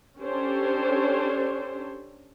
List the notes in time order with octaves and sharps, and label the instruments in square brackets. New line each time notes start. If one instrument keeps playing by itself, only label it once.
[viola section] C#4 D4 G4 A4 C5 C#5